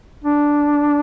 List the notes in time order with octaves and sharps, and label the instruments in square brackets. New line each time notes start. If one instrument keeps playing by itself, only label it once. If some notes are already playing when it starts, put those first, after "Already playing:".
[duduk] D4